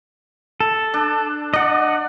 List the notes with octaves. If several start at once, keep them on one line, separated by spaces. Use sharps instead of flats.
A4
D4
D4 D5 D#5 F#5